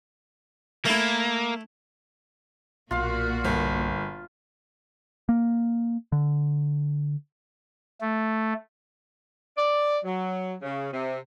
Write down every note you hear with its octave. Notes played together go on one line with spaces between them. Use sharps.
A3 A#3 E4
B1 A#2 A#3 F4 F#4 F5 C6 F#6
G1
A#3
D3
A3
D5
F#3
C#3
C3